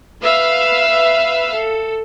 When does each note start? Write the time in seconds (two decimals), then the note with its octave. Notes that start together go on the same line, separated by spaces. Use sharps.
0.23 B4 E5 F5
1.56 A4